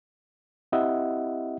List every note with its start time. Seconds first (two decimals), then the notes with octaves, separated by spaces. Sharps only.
0.72 C4 E4 G4 D#5 E5 F#5